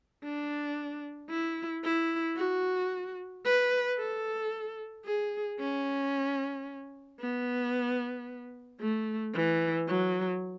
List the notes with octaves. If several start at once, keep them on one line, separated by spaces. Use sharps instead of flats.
D4
E4
E4
F#4
B4
A4
G#4
C#4
B3
A3
E3
F#3